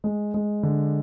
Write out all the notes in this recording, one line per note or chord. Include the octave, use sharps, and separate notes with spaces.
G#3
G#3
D3